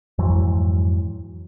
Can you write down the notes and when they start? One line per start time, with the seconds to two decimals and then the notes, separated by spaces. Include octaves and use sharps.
0.19 F2 G#2 E3 F#3